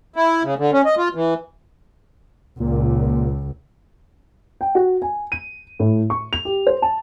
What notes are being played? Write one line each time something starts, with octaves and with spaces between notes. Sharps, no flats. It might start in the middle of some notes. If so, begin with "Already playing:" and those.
E4
C#3
D3
C#4
D#5
F4
E3
C#2 A#2
G5
F#4
G#5
D#7
A2
C#6
F7
G4
C5
A5